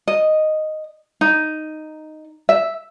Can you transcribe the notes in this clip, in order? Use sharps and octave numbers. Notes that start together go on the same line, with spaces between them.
D#5
D#4
E5